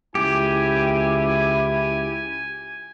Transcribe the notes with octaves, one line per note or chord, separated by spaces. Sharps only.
C#2 E4 G4 G#5